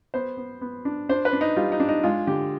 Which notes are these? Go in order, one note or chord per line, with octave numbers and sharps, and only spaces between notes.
B3 C5
B3
B3
D4
D4 C5
B4
D4
D#4
G3 F4
D#4
D4
D#4
G#3 F4
D3 G4